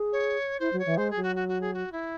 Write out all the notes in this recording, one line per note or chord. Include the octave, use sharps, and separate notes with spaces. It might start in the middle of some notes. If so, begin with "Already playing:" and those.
Already playing: G#4
C#5
E4 C5
F#3
C#5
E3
G#3 C5
G#4
F#3
F#4
F#4
F#4
G#4
F#4
E4